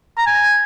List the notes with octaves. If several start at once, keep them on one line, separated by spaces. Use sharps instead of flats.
A#5
G#5